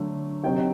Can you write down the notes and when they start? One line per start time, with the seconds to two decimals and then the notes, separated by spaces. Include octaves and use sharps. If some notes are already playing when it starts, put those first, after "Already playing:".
Already playing: D3 F#3 A3
0.43 C3 F#3 C4 D#4 G5